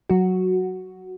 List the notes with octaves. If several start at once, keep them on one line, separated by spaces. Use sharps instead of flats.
F#3 F#4